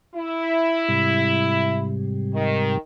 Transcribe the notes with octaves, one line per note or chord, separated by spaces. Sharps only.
E4
G#2 C3 G3
D#3